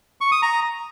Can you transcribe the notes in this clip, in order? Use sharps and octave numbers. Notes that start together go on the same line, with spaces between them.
C#6
D#6
A#5